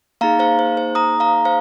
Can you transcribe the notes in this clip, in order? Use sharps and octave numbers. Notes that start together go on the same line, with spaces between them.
A#3 D#4 G#4 F5 A#5
C5 F5
C5
C5
A#5 D#6
F5 A#5
C5 F5